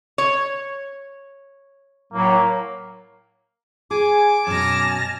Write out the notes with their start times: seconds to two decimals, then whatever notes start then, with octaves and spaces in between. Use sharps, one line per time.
0.18 C#5
2.13 A2 F#3 A#3
3.91 G#4 G#5 D6
4.47 F#2 B2 A5 F6 A#6